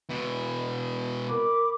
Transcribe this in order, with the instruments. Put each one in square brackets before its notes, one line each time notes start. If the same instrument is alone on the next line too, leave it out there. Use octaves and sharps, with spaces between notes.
[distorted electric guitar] B2 E3
[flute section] A#4 B5 D6